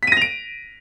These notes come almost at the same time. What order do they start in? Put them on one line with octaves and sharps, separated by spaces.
B6 D#7 A#6 F7 D7